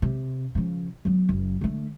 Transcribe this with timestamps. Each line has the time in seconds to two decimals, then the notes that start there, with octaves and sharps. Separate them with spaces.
0.02 C3
0.55 C#3 F3
1.05 F#3 B3
1.29 F#1
1.61 D3 A3